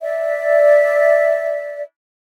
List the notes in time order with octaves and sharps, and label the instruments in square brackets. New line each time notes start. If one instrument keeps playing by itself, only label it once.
[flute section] D5 E5